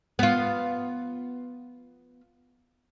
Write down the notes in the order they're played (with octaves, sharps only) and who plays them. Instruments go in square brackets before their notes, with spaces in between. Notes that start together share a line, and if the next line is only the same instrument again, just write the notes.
[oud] B3 F4